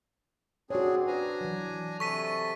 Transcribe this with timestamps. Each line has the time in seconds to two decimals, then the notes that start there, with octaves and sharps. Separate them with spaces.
0.70 C4 D4 F#4 G#4 C#5
1.07 D4 B4 G#5 A#5
1.41 E3 F#3
2.00 C3 A4 C#6 B6 D#7